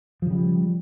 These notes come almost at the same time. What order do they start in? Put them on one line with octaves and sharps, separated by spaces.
F3 C#3 G3